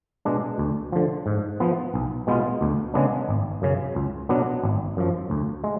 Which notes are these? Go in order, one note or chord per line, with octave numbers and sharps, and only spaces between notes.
B2 G#3 D4
D2
D3 F3
G#2
F3 B3
B1
B2 G#3 B3 F4
D2
C#3 G#3 B3 D4
G#1
F#2 C#3
C#2
B2 F#3 B3 D4
G#1
F#2 F3
D2
G#3